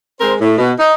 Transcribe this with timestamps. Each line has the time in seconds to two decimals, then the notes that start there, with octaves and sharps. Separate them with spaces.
0.20 G#3 C4 A#4 C5
0.40 A2
0.57 B2
0.79 D#4